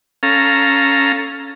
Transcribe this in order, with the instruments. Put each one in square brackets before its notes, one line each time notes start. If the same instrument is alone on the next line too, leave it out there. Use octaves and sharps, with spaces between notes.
[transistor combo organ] C#4 A4 F5 A#5